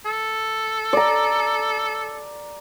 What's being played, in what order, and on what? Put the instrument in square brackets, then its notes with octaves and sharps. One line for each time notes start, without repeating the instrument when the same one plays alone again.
[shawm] A4
[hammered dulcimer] D5 A#5